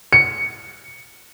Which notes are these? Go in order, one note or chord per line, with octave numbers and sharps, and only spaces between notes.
C#7